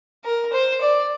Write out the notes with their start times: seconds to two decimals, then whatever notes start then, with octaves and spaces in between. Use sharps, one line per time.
0.24 A#4
0.53 C5
0.82 D5